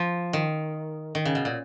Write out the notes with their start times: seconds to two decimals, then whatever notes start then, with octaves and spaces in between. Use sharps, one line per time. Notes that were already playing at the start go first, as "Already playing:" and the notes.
Already playing: F3
0.33 D#3
1.15 D#3
1.25 C#3
1.35 B2
1.45 A#2